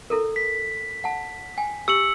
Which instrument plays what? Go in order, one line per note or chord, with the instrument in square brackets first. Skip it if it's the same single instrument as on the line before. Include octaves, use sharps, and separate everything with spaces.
[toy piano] E4 A4 A#4
[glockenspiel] B6
[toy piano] F#5 A5
G5 G#5
[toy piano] G4 [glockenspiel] E6 C#7 F#7